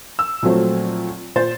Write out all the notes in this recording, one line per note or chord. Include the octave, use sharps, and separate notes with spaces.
E6
A#2 F3 F#3 A3 C4
A#2 C5 A6